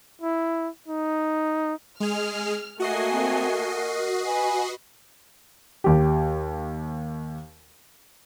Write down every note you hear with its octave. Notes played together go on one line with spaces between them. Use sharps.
E4
D#4
G#3 G#4 F6
A3 A#3 F#4 D#5 G#5 C7
C4
A#4
B4 G#5
D#2 G4